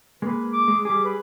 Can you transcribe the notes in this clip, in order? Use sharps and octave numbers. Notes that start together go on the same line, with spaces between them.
G#3 A#3 B4
D6
G#3
G3 G#4 D6
B4